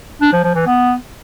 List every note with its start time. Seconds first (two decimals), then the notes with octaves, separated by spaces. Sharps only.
0.21 D4
0.33 F3
0.44 F3
0.55 E3
0.67 B3